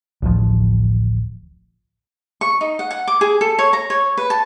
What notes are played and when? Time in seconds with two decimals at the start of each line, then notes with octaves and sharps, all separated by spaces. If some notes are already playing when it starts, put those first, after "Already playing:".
0.22 D1 A1 F3
2.41 C#6
2.61 D#4
2.79 F#5
2.91 F#5
3.08 D6
3.21 G#4
3.41 A4
3.59 C#5
3.73 A#5
3.90 C#5
4.18 B4
4.30 A5